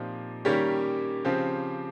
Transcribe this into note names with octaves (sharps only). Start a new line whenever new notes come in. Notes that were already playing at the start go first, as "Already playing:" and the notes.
Already playing: A#2 F3 C4 D#4 G4
D#3 G3 A#3 C#4 G4
C#3 F3 C4 G4